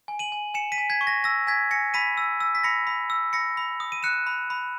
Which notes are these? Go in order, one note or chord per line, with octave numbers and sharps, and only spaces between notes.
G#5
D#7 F#7
G#5
G#5 C#7 E7
B6 D#7
G#5
G#6 B6
C#6
A#6
E6 A#6
G#5 G#6 B6
G#5 A#6 C#7
B5 B6 D#7
E6
E6
B6
B5 A#6 C#7
B5
E6
B5 A#6 C#7
B5
D#6
D#7
F#6 C#7 E7
B5
B5